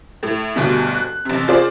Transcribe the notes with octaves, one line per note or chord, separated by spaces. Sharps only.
A2
D2 G2 B2
F#6
A1 C3
F4 G#4 C5 D5